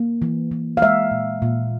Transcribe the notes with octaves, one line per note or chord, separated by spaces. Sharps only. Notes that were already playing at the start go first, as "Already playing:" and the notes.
Already playing: A#3
E3
E3
F5
G#3 E5
A#2
A#2